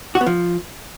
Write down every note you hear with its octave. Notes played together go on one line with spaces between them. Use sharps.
F#4
B3
F3